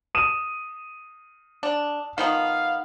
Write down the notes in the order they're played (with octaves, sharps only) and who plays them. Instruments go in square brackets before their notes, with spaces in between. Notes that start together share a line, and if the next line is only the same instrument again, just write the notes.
[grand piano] D#6 D#7 E7
[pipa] D4
[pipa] D#3 F3 B3 [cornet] F5